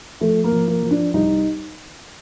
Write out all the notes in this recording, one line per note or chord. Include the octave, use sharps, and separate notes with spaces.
F3 A3
A#3
F3
A#3
F3
D4
C2 D#4